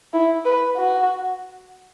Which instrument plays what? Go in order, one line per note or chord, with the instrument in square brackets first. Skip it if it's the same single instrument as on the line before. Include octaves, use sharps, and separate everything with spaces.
[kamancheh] E4
B4
F#4